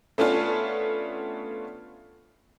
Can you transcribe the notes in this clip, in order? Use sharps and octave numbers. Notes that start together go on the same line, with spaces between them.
A3 B3 C#4 D4 F4